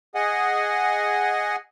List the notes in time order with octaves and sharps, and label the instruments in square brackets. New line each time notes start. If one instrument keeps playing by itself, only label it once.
[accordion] G#4 D#5 F#5 G#5